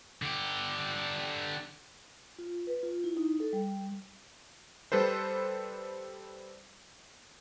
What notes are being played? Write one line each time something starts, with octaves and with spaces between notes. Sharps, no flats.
D3 G4
F4
B4
F4
E4
D#4
A4
G3
G3 A4 B4 C5